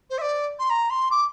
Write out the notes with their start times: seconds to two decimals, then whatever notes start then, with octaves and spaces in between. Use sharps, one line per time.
0.10 C5
0.18 E5
0.21 D5
0.59 C6
0.69 A#5
0.90 C6
1.11 D6